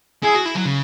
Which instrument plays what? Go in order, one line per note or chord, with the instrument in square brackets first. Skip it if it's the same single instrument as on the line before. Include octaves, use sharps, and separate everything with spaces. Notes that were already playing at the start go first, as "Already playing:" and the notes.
[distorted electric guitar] E4 [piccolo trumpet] G#4
[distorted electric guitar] F#4
E4
F#3
C#3